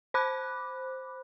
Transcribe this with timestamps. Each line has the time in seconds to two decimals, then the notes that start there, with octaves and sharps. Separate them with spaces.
0.14 C5 B5 D6 F#6